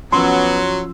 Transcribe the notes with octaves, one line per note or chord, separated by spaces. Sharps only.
F3 F#3 B3 C#4 F#4 C6 E6